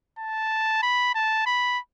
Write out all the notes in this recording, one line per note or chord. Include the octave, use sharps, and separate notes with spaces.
A5
B5
A5
B5